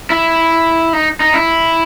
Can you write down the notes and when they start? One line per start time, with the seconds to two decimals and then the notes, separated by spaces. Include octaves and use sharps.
0.10 E4
0.93 D#4
1.20 D#4
1.34 E4